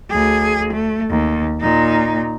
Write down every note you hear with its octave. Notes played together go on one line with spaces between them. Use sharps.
D2 G#4
A3
D#2
A#2 D#4